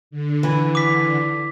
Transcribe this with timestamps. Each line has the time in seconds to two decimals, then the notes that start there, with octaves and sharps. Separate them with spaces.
0.11 D3
0.43 E3
0.75 D6 B6